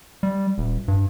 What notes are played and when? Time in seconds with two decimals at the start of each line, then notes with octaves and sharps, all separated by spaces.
0.23 G3
0.58 D#1
0.88 G2